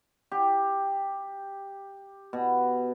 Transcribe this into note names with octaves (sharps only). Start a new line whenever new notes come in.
G4
B2